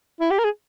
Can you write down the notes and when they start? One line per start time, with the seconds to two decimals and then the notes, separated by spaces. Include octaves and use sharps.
0.21 E4
0.31 G4
0.39 A#4
0.44 G#4